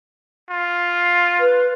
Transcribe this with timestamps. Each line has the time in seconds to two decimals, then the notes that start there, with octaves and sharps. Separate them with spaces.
0.50 F4
1.40 B4